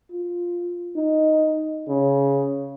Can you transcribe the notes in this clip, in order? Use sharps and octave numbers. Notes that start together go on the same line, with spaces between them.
F4
D#4
C#3